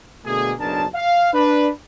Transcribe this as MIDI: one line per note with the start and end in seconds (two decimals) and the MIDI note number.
0.25 0.53 47
0.25 0.53 50
0.25 0.53 57
0.25 0.53 58
0.25 0.53 68
0.60 0.85 30
0.60 0.85 35
0.60 0.85 62
0.60 0.85 68
0.60 0.85 70
0.60 0.85 81
0.95 1.30 77
1.34 1.70 62
1.34 1.70 71